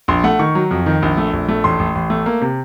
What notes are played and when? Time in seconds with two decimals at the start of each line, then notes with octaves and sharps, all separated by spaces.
0.08 A#1 C6
0.24 A3 F#5
0.39 D#3 C#6
0.55 F#3
0.71 F2
0.86 D#3
1.02 A#1
1.17 A3
1.33 A#1
1.49 A3
1.64 A1 C6
1.79 A1
1.95 A1
2.10 A3
2.26 A#3
2.41 C3